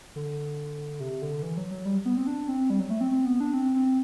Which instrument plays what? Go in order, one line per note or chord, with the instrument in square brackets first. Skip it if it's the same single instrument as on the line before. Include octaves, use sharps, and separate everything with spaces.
[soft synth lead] D3
C3
D3
E3
F#3
F#3
G3
B3
C4
D4
C4
G3
F#3
A3
C4
C4
B3
D4
C4
C4